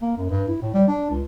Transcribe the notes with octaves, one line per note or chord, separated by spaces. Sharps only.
A#3
F#2
G2
E4
A2
G3
D4
C#2